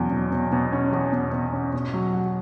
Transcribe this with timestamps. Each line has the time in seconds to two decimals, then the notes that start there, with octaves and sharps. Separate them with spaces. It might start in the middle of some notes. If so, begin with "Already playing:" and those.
Already playing: E2 B2 F#3 C#4
0.12 B2
0.32 B2
0.52 B2
0.73 C#4
0.92 E2
1.13 B2
1.33 B2
1.53 C#4
1.73 B2
1.94 F#3
2.13 F#4